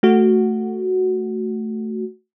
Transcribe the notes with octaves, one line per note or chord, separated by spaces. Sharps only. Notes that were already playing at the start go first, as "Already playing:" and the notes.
A3 F#4